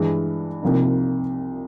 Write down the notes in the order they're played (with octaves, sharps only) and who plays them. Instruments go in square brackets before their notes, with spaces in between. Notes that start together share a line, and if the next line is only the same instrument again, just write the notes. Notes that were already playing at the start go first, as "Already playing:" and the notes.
Already playing: [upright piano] G2 E3 G#3
C2 C3 F3 A#3 D#4